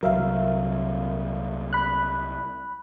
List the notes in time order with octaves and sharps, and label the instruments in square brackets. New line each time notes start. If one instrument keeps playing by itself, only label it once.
[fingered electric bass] C2 F#3 [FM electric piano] A#4 E5 F5
[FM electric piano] B5 F#6